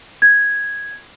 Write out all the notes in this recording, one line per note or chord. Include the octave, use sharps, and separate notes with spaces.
G#6